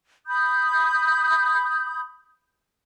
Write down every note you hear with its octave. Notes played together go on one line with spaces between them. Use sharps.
B5 D#6 G6